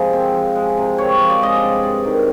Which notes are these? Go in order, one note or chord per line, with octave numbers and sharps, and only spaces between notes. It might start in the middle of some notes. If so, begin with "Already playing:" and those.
Already playing: C3 F3 G#3
C4
F3
G#3
C3
C4 C#5
F3
D5
G#3 D#5
D5
G2
G2
D#3